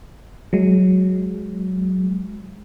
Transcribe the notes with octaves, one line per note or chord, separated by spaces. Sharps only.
F#3 G#3